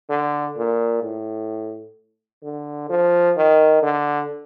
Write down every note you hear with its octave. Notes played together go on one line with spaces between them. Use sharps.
D3
A#2
A2
D3
F3
D#3
D3